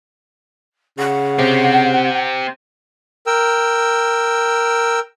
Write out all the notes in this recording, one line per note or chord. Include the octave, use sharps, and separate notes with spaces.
C#3 F#5
C3 C4 G4
A#4 G5 E6